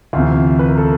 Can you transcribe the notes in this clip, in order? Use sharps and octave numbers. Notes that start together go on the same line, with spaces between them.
D2 C3 E3 F4
B4
A#4
A4